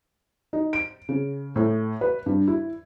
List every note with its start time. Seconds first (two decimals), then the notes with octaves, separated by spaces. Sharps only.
0.53 D#4
0.73 D7
1.09 C#3
1.56 A2
2.01 B4
2.26 G2
2.48 E4